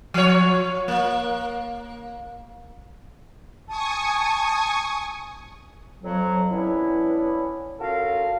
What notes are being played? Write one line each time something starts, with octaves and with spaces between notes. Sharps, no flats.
F3 C#5
A#3
G#5 A5 C#6 D#6
F2 F#3
E3 B3 C#4 D4 E4
C#4 F4 F#4 A4 A#4 F5